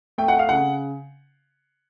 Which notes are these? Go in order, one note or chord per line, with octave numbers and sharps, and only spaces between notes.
A3 G5
F#5
F5
C#3 F#5